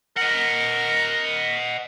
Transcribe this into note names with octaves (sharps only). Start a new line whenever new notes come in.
A#4 D#5 F#5